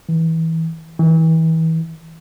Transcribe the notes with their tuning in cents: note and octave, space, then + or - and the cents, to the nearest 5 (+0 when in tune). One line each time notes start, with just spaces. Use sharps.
E3 -25
E3 -35